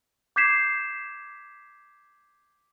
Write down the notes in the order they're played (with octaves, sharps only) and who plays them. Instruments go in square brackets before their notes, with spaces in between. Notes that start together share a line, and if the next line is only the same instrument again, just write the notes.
[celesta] D6 G6 G#6 B6 C7 E7